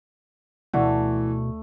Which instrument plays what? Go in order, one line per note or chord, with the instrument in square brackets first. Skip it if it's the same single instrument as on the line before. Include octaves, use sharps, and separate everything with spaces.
[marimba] D2 D5 F#5 [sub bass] B2 [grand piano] E3 [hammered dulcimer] A3